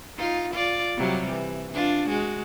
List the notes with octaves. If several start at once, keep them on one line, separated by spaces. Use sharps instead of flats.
D#4 F4
F4 D5
C3 F#3 G3
E3
D4 F4
G#3 F#4